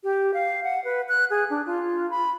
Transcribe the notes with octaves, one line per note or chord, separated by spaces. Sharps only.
G4
F5
F#5
B4
F#6
G#4
D4
F4
B5